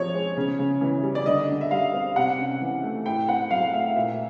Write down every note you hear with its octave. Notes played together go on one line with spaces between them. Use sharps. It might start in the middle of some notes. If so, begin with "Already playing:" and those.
Already playing: C3 F3 C4 C#5
G#3
C#3
C#3
E3
G3
D5
D3 D#5
D3
E5
G3 F5
C4
C3 F#5
C#4
E3
A3
A2 G5
C4 F#5
F#3 F5
A3 E5
A#2 E5